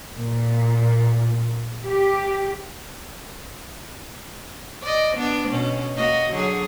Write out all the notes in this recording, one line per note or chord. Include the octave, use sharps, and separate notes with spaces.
A#2
G4
D5 D#5
B3 D4
B2 C#4
A#3 F#4 D#5
D3 F#3 G#4